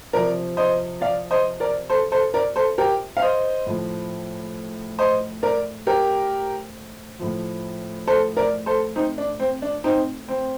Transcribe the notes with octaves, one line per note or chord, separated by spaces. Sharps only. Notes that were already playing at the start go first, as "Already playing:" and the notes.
C3 F3 A#4 D5
C5 D#5
D5 F5
C5 D#5
A#4 D5
A4 C5
A4 C5
A#4 D5
A4 C5
G4 A#4
F5
C5 D#5
A2 F3
C5 D#5
A#4 D5
G4 A#4
A2 F3
A4 C5
A#4 D5
A4 C5
C4 D#4
D4
C4
D4
C4 D#4
C4